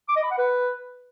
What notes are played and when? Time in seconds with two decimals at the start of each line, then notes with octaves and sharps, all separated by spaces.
0.09 D6
0.16 D#5
0.23 B5
0.31 F#5
0.38 B4